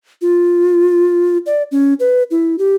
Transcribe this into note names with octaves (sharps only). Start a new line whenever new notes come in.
F4
D5
C#4
B4
E4
G4